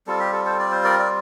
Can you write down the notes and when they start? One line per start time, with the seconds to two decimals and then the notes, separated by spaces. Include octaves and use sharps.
0.07 G3 C4 F4 A4
0.20 G4
0.33 A4
0.45 A4 C5
0.59 D5
0.72 C5
0.84 A#4 D5
0.99 D5